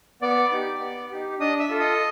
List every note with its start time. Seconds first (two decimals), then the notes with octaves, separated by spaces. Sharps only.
0.22 B3 D5 D6
0.52 D#4 G4
0.80 B3
1.11 D#4 G4
1.40 D4 D#5 D#6
1.59 E5 E6
1.70 F4 A4
1.80 D#5 D#6